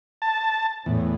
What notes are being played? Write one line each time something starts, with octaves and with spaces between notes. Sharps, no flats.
A5
E2 A2